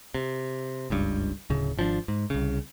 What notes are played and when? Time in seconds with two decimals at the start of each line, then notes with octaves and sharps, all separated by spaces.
0.14 C3
0.90 F#1 C#2 G2
1.50 D1 C#3
1.77 G#1 F3 C#4 D4
2.08 G#2
2.30 C2 C#3